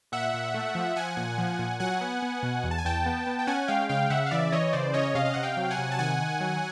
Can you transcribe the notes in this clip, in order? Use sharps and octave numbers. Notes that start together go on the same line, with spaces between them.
A#2 E5 F#5
A#2
A3
F3
F3 F#5 G#5
A#2
F3
A#2
F#3 F#5 G#5
B3
B3
B2
E2
A5
G#5
E2 G5 A5
B3
B3
G5
C#4 F#5 G#5
G#3 F5 G5
C#3 F5 G5
C#3 E5 F#5
F5
E3 D5 E5
E3 C#5 D#5
C#3 C5 D5
C#4 C#5 D#5
C3 D#5 F5
F5
C3 F#5
F5 G5
F#3
F#5 G#5
C3
A5
D#3 F#5 G#5
D#3
F#3